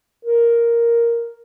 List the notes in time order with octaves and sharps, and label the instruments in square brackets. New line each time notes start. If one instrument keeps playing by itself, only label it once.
[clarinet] A#4